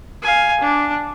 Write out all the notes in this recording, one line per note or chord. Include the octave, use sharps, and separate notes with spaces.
F5 G#5
D4